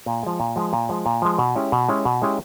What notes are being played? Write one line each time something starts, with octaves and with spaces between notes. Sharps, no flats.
A#2
F3 G#3
A#2
F3 G#3
A#2
F3 G#3
A#2
F3 G#3
B2
G#3 C#4 E4 G4
B2
G#3 C#4 E4 G4
B2
G#3 C#4 E4 G4